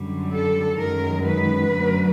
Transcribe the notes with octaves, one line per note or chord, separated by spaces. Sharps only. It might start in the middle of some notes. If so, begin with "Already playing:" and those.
Already playing: F#2 D3 G3
A4
F#2 D#3 G#3 A#4
B4
F#2 D3 F#3 A3